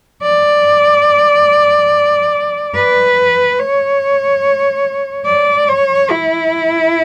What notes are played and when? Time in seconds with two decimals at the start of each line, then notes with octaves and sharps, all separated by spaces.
0.23 D5
2.74 B4
3.59 C#5
5.26 D5
5.69 C#5
6.10 E4